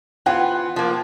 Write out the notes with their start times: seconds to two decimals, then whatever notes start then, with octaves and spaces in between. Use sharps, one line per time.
0.26 E3 B3 F4 F#5 G5 F#6
0.76 F3 A#3